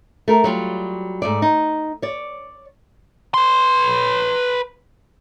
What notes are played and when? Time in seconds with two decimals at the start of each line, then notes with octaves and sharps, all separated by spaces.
0.28 A3 A#4
0.44 F#3 G3 F4
1.22 G#2 A3 D5
1.42 D#4
2.02 C#5 D5
3.34 B4 C6